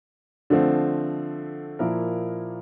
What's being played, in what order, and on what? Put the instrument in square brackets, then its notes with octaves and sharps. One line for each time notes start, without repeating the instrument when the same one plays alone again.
[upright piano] D3 F3 A3 C4
A#2 F3 A#3 E4 A#4